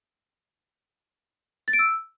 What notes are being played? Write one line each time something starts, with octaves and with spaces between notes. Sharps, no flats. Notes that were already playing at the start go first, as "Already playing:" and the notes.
A6
D7
E6